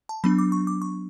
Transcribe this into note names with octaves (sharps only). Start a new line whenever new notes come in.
A5
F#3 B3 D4 B5
D6
C#6
D6
C#6